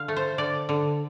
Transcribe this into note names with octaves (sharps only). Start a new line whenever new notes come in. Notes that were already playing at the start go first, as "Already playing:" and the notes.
Already playing: D3 F5
A3
C5
D3 D5
D3